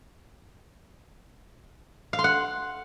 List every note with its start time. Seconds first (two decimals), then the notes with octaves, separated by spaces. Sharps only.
2.13 F5
2.19 C6
2.24 F#5